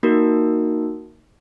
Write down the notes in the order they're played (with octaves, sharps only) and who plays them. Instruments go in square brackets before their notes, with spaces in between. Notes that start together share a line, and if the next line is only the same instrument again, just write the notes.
[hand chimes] A#3 D#4 F#4 A#4